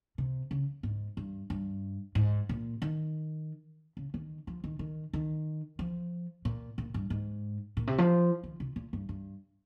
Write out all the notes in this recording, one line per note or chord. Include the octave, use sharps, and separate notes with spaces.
C3
C#3
G#2
G2
G2
G#2
A#2
D#3
C#3
D#3
F3
D#3
D#3
D#3
F3
A#2
A#2
G2
G#2
A#2
C3
F3
D#3
C3
A#2
G2
G2